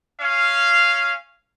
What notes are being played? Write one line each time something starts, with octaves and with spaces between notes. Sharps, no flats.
C#4 F5